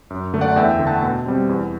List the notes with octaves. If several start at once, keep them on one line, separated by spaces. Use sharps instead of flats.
F#2
D3 A3
D5 F#5
E2 E5 G5
D3 A3
F#5 A5
B2
G3 C4
E2